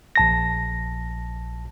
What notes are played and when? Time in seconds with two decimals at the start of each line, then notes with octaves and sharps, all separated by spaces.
0.16 A#1 A5 A#6